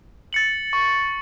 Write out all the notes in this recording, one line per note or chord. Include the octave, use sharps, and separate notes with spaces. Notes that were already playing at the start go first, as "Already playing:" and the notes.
A6 C#7 F#7
C#6